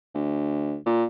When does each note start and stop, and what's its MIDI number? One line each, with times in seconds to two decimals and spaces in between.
0.15 0.76 38
0.86 1.04 46